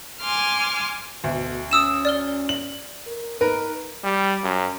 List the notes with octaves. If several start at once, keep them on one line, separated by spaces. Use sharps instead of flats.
G#5 C6 D6 F6
D2 B2
C#4 D#6 E6 E7
D5 F6 G7
F#7
A#4
D#4 A#4 B4
G3
F#2